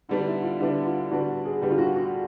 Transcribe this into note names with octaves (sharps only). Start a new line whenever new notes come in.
D3 G3 B3 D4 D#4
E4
F4
D3 G3 B3 D4 E4
F4
D3 G3 B3 D4 F#4
G#4
D3 G3 B3 D4 G4
F4
F#4
F#4